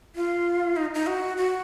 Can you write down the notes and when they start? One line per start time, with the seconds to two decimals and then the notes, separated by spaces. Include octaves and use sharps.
0.16 F4
0.76 D#4
0.95 D#4
1.07 F#4
1.37 F#4